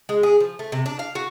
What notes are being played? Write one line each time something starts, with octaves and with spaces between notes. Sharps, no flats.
G#3
G#4
F3
A3
C3
D4
F5
F#4